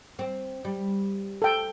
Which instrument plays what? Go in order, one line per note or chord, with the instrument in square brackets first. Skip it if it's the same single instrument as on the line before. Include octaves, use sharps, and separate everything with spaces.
[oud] C4
G3
[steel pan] A4 G5